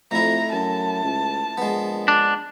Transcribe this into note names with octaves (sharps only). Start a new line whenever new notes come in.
F2 A3 E4 A#5
F#2 A5
C#2
A#1 G#3 B3
D4